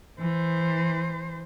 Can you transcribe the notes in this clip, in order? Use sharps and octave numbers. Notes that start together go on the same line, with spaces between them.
E3 C5